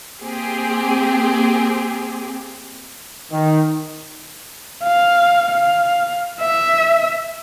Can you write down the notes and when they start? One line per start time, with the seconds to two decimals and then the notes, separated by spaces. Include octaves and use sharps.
0.21 A#3 C4 G4 G#4
3.31 D#3
4.83 F5
5.52 F5
6.40 E5